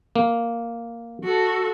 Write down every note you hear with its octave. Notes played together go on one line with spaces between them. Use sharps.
A#3
F#4 A4